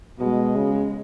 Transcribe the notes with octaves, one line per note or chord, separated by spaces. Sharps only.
B2 G#3
C#3